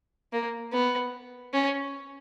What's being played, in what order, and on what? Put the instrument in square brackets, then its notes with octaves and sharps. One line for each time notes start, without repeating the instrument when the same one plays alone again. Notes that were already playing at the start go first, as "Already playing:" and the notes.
[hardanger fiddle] A#3
B3
C#4